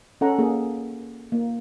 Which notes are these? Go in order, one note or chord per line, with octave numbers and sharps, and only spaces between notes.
C#4 A4 F#5 A#5
A#3 G#4
A#3